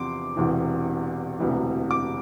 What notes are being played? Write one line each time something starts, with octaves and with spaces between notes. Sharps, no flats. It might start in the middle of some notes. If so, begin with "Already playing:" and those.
Already playing: E2 C3 F3 C6 D6
E1 E2 C3 E3
E1 D2 C3 E3
D6